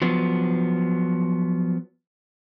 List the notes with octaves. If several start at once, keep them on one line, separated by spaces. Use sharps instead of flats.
F3 F#3 B3